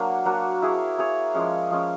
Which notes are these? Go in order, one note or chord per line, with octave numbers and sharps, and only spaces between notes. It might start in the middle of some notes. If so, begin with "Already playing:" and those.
Already playing: F#3 A#3 D4 F#4
F#3 A#3 D4 F#4
E4 G#4 C#5
E4 G#4 C#5
F3 G#3 C#4
F3 G#3 C#4